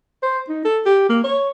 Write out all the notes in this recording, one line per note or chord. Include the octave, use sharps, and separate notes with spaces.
C5
D#4
A4
G4
A#3
C#5